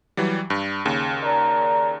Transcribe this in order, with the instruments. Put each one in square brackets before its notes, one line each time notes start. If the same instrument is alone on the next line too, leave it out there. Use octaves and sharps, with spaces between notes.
[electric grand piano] E3 F#3 G3
G2
D#2 C#3
[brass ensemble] A#4 D5 A#5